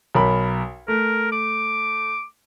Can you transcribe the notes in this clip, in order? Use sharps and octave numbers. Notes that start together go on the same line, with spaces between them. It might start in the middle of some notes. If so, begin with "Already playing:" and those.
B1 A#4 B5
A3 A#4
D6